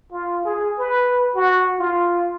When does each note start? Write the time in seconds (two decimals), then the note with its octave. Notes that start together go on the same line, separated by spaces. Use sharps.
0.12 F4
0.45 G#4
0.78 B4
1.35 F#4
1.79 F4